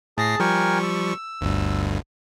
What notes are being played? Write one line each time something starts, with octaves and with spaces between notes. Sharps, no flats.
A2 G#4 A5 A#6 C7
F3 G3 A#4 G5 G#5 C#6
E6
G1 D2 G2